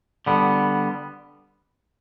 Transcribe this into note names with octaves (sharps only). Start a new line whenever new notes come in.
D3 G3 B3